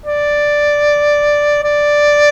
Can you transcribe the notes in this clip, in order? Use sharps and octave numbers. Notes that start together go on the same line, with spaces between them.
D5
D5